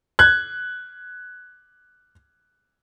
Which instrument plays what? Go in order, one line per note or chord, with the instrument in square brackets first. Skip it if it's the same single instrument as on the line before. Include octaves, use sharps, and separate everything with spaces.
[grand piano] F#6 G#6